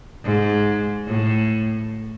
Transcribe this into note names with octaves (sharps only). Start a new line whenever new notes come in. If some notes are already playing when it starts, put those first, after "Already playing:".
G#2
A2